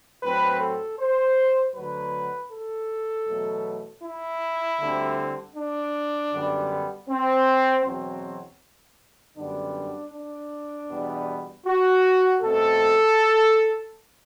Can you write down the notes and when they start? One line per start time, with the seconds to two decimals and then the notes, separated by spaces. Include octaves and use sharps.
0.23 A2 F#3 C4 B4
0.61 A4
0.99 C5
1.75 D2 D3 F#3 B4
2.52 A4
3.28 E2 B2 F#3 A3
4.04 E4
4.80 D2 D3 G3 C4
5.56 D4
6.33 F#2 D3 G3 B3
7.09 C4
7.85 E2 B2 F#3 C4
9.37 F#2 D3 G3 B3 D4
10.14 D4
10.90 E2 B2 G3 B3
11.66 F#4
12.42 B2 A3 C4 A4